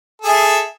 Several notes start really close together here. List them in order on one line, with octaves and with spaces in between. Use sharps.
A4 G#4 E5